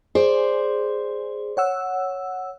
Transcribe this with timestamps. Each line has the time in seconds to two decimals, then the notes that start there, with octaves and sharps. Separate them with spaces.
0.15 G#4 C5 D5
1.57 C#5 F#5 E6